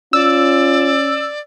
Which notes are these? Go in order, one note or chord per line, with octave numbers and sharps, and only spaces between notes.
C#4 F4 D5 E6